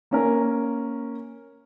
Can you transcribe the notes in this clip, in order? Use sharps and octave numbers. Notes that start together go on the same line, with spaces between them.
A#3 C#4 A#4